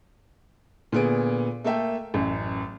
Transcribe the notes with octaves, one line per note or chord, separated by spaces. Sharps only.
A#2 D3 B3 G#4 D7
A3 A#3 A4 E5 G5
A1 F#2